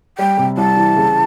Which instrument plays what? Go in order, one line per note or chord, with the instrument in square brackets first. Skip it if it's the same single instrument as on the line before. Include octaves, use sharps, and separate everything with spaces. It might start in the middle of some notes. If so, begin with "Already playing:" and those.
[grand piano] G3 [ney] G5
[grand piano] C3
[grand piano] C2 [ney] A5
[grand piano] E3
C#3